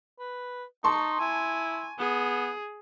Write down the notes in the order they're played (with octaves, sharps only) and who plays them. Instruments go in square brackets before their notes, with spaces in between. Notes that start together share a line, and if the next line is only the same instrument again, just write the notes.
[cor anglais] B4
[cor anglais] D#4 [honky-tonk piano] A5 C6 C#6
[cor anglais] E4 [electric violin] G#5
[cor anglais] B3 [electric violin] G#4